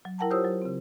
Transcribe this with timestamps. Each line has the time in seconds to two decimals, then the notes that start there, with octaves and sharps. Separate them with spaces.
0.05 F#3
0.18 E4 A#4 F#5 G5 A5 A#5
0.30 F4 G4 C5 C#5 D#6 E6
0.45 F#3
0.62 C#3 C4